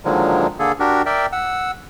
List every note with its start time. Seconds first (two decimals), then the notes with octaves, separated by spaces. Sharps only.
0.05 A#2 D3 D#3 F3 F#3 G#3
0.59 D3 A#3 G#4 A4
0.80 D4 F#4 G4 A#4
1.06 A#4 D5 E5 G5
1.32 F#5 E6